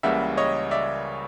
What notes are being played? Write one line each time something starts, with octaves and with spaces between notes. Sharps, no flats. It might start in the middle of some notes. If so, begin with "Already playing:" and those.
C#2 C#3 E3 G3 A#3 E5 F#5
C#5 D#5
D5 E5